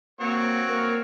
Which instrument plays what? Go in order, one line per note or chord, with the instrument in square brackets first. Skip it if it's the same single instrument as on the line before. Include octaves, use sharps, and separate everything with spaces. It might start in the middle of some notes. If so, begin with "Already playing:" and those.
[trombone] A#3 [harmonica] C4 F#4 C#5
[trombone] A#3 [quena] A#4